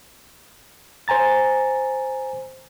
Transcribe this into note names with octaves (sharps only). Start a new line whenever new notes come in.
C5 G#5 A#5 A6